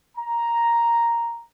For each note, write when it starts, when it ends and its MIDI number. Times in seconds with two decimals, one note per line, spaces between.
0.17 1.42 82